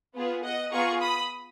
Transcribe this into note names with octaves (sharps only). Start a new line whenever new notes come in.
B3 F4 G#4
D#5 F#5
B3 F4 G#4 A#5 C#6
B5 D#6